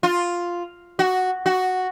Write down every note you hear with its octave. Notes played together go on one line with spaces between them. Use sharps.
F4
F#4
F#4